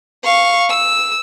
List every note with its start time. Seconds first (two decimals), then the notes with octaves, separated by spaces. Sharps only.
0.25 F5 C#6
0.70 E6